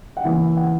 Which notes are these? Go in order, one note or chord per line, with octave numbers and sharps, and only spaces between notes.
F#5
C#3 E3 A#3 E5
F#5